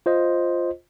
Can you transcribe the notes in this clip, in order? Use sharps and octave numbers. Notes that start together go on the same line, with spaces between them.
F4 C5 D#5